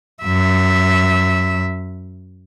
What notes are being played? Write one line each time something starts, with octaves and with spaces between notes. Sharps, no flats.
F#2 E5